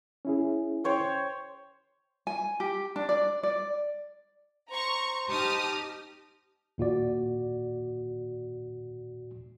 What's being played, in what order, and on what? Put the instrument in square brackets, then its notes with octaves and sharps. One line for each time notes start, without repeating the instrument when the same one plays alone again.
[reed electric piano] C#4 E4 G#4
[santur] C5 C#5 G5
[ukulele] G#5
G4
D4
D5
D5
[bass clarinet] C5 [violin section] A#5 C#6
[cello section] D#4 G4 [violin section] A5 D#6 F6
[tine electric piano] D#2 A#2 F#4 D5